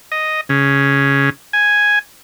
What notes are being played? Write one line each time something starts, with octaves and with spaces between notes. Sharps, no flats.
D#5
C#3
G#5